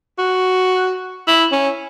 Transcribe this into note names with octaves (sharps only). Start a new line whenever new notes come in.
F#4
E4
C#4